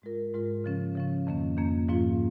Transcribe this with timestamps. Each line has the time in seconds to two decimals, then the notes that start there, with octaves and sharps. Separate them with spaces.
0.02 G#2 G#3 F4 A#4
0.33 G#2 G#3 F4 A#4
0.64 C#3 F3 C#4
0.95 C#3 F3 C#4
1.27 F2 D#3 A#3 C#4
1.57 F2 D#3 A#3 C#4
1.89 G#2 F3 A#3 C#4 F4